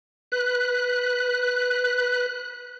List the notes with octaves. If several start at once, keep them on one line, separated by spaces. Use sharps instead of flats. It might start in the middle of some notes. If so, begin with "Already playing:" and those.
B4 F#6